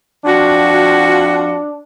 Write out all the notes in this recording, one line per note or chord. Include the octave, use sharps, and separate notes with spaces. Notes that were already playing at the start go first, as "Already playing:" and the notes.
F2 D4 F4 F#4